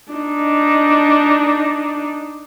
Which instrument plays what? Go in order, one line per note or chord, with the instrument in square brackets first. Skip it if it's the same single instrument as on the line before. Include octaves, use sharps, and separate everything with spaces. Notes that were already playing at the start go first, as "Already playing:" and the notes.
[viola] D4 D#4